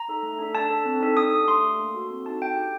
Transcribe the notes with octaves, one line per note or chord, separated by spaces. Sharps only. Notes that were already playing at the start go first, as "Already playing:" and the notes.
Already playing: A#5
D#4 A4
A3
D4 A4
D4 A5
A4
C4
D#4 A4
D4 D#6
G4
A3 C6
D4 A4
A#3
F#4 A4
C4
D#4 F#4 A4 A5
D4 G5
G4